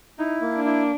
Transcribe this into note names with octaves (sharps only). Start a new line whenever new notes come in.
D#4 E4
A#3
D4
E4